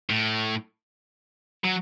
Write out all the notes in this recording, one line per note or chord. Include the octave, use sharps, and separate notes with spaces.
A2
F#3